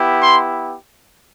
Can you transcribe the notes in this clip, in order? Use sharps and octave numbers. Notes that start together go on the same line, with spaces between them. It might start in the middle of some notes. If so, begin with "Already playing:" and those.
Already playing: B3 E4 G4
C6